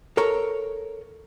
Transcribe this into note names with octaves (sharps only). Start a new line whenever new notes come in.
A4 A#4 C#5 A#5